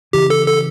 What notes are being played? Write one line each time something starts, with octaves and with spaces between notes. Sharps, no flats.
C#3 E3 G4
A4
A4